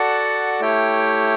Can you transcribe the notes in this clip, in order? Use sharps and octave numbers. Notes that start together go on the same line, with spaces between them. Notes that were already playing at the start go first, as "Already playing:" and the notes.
Already playing: F#4 A4 D5 F#5 A5
A3 E4 G4 C#5 G5